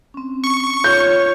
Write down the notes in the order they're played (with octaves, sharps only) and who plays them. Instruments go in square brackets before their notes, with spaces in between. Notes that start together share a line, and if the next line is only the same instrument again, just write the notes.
[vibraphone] C4 C#4
[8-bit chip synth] C#6
[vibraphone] F4 [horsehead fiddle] C#5 [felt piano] G6